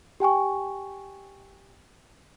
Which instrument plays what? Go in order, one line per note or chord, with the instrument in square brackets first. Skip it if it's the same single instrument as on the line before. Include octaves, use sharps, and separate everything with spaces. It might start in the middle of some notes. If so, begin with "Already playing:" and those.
[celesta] G4 G5 G#5 C#6